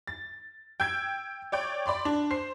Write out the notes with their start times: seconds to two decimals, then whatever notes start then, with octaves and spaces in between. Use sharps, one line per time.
0.07 A6
0.80 G5 E6 G6 G#6
1.52 C#5 D5 G5
1.86 D5 B5 C6 D6
2.05 D4
2.31 C5 C7